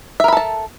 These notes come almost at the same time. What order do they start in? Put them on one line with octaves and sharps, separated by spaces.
E5 A#4 B5 A4 A5